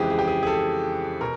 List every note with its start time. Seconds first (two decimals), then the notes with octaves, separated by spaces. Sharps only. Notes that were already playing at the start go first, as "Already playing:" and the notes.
Already playing: F2 C#3 E3 G#3 G4 G#4
0.10 G#4
0.19 G4
0.27 G#4
0.43 G#4
0.47 A4
1.21 B2 A#4